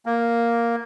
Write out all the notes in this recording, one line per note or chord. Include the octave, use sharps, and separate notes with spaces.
A#3